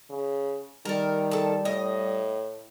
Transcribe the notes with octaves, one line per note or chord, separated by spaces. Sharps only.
C#3
D#3 G3 A4 A#4
A4 A5
A2 D#5